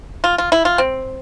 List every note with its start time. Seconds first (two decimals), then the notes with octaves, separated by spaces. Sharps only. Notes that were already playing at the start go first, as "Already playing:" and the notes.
0.24 F4
0.38 F4
0.52 E4
0.65 F4
0.78 C4